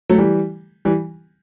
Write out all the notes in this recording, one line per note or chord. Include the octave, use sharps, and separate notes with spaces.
F#3 A3
E3 G3
E3 G3